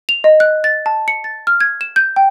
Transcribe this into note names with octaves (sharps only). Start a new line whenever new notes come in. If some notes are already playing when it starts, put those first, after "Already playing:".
F7
D#5
F#6
A6
A5
C#7
A6
F6
G#6
E7
G6
G5